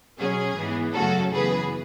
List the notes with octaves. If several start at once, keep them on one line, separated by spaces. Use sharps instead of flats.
B2 F#3 C#4 G#4
G#2 E3 B3
F#2 C#3 F#3 A3 C#4 F#4 A4
F#2 C#3 E3 B3 G#4 B4